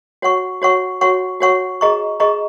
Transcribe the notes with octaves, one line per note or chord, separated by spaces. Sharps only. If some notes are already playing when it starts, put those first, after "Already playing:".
F#4 C#5 F#5 C#6
F#4 C#5 F#5 C#6
F#4 C#5 F#5 C#6
F#4 C#5 F#5 C#6
G#4 D#5 A#5 C#6
G#4 D#5 A#5 C#6